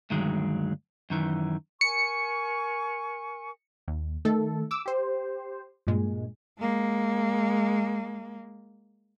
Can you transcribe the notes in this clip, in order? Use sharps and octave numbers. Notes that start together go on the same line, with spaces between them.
D2 G2 D#3 F#3 G#3
F#2 D#3 E3
A#4 G#5 C#6 C#7
D#2
D#3 A3 A4
D6 E6
G4 C5
G2 A#2 G#3
G#3 A#3